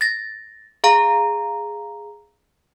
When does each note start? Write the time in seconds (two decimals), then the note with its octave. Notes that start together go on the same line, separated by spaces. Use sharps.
0.01 A6 A#6
0.84 G#4 F5 A#5